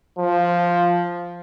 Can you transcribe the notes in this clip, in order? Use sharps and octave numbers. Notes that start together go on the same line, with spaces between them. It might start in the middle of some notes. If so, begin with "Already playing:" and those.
F3